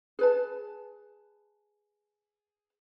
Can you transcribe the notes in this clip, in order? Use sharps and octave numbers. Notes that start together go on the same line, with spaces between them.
G#4 B4 A5